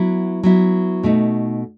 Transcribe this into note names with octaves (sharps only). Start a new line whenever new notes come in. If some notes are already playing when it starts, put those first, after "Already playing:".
Already playing: F#3 B3 E4
F#3 B3 E4
B2 A3 D#4